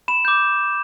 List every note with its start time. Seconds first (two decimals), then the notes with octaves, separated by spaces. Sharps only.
0.08 B5 E7
0.25 D6 G6